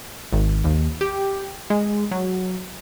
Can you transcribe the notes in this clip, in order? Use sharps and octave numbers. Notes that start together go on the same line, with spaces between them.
G#1
D#2
G4
G#3
F#3